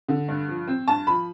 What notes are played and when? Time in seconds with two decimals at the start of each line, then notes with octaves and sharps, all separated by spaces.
0.08 D3
0.28 G2
0.48 F3
0.68 C4
0.88 G2 A5
1.07 F3 B5